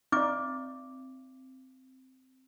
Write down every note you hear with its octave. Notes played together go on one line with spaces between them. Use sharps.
C4 D#4 D5 D6